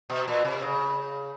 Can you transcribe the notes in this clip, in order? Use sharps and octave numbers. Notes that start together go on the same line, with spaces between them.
B2
A#2
C3
C#3